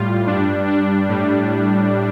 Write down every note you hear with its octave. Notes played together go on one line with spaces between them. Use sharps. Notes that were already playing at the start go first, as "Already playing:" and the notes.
Already playing: A2 G3 F4
G2 G3 D4
D4
A2 G3